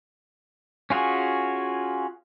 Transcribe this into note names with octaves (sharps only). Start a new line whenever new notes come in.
C#4 F4 F#4 G#4